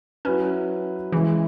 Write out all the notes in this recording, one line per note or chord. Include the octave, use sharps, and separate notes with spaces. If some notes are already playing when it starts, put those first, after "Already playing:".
F#3 C#4 E4 B4
C#3 E3 G#3 E4